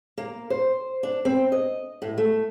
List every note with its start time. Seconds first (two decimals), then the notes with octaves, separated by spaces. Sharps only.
0.18 A#3
0.50 C5
1.03 D4
1.25 C4
1.52 D#5
2.02 A2
2.18 A3